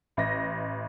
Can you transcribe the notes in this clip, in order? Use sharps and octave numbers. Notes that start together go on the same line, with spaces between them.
A1 D#5 A#6